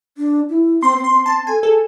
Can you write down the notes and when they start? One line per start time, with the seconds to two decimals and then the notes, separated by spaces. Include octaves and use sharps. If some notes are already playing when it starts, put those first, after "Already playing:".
0.18 D4
0.49 E4
0.82 C4 C6
0.98 C4
1.04 C6
1.14 C4
1.26 C4 A5
1.47 A4 G#5
1.63 G#4 A4